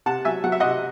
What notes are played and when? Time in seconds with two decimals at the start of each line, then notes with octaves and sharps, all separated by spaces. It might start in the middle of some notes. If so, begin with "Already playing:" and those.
0.06 C3 F#5 A5
0.25 F#3 E5 G#5
0.44 F#3 F#5
0.52 E5
0.60 C3 D#5 F#5